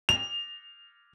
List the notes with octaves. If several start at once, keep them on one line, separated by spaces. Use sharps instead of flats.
F7